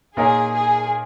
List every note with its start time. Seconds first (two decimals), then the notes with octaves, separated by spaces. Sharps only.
0.16 A#2 A#3 D#4 G#4 A#4 C#5
0.54 G#4